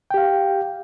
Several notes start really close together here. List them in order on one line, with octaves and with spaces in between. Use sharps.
G5 G4 F5